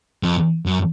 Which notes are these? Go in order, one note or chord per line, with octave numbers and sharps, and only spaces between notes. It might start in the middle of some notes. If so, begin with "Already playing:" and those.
F2
F#2